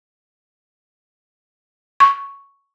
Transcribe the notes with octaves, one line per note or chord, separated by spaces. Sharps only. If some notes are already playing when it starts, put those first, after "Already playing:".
C#6